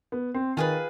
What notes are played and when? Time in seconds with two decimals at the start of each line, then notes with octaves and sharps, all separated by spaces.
0.12 B3
0.34 C4
0.57 D#3 F4 G#4 B4